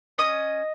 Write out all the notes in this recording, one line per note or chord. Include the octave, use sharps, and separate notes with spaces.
C#4 D#5 D#6